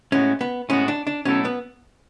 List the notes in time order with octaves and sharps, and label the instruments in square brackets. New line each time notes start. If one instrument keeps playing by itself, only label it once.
[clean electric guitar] A2 G#3 B3 F#4 [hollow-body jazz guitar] C#4
[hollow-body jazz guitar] B3
[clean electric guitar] A2 G#3 B3 F#4 [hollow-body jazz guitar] C#4
[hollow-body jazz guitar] D4
D4
[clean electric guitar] B2 F#3 A3 E4 A4 [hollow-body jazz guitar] C#4
[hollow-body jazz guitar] B3